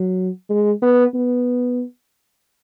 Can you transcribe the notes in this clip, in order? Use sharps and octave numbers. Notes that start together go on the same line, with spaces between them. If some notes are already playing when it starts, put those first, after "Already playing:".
Already playing: F#3
G#3
B3
B3